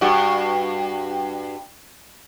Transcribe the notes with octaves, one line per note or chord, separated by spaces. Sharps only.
G2 F#4